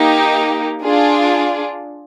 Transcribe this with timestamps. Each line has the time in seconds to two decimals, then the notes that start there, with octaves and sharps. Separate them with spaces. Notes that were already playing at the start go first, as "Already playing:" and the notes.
Already playing: A#3 D#4 G4
0.83 D4 F4 G#4